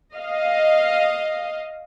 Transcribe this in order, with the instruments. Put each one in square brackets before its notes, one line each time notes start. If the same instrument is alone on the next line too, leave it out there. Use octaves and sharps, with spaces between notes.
[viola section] D#5 F5